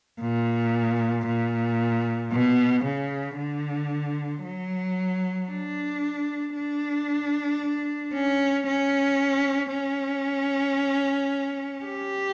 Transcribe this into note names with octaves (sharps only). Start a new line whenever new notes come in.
A#2
A#2
B2
C#3
D3
F#3
D4
D4
C#4
C#4
C#4
G4